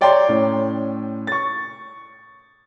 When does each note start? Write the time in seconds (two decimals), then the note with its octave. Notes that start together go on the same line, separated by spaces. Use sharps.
0.01 C#5 D5 G5 A#5 C6
0.29 A2 C#4
1.27 C#6 A6